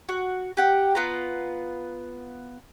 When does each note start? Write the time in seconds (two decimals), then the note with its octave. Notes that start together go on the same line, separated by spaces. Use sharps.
0.09 F#4
0.57 G4 F#5 G5
0.95 B3 F4 B4 A#5